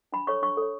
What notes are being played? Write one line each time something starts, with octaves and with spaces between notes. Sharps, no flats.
D4 B5
A4 C#5 C#6
D4 C#6
A4 C#5